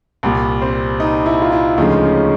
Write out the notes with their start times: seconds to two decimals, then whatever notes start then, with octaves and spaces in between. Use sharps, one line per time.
0.23 C2 A#2 G3
0.62 C4
1.00 D#4
1.26 E4
1.42 F4
1.52 E4
1.78 D2 C#3 F3 G#3 D#4
2.04 C#4